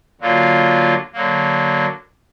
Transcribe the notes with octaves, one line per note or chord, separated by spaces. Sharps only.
D3 F#3 A#3 F4
D3 F#3 A#3